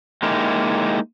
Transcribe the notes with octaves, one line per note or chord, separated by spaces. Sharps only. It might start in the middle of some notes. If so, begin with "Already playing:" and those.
G#3 A#3 D#4 E4 G4